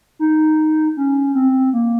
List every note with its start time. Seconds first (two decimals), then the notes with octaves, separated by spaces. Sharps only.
0.19 D#4
0.97 C#4
1.35 C4
1.73 A#3